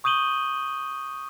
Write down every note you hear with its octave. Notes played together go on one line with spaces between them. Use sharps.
C#6 D#6 G6 D#7 F#7 G7